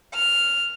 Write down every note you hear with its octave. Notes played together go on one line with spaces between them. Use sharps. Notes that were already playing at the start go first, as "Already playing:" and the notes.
F6